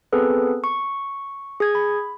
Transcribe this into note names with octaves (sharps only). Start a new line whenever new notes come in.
B3 C4 G#4 A4 B4
C#6
G#4 G#6
B5